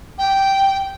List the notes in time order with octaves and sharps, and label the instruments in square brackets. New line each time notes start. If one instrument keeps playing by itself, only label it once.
[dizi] G5